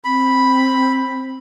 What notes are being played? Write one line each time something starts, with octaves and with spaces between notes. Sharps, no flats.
C4 B5